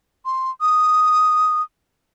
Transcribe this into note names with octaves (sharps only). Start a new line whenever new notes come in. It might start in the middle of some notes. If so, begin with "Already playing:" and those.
C6
D#6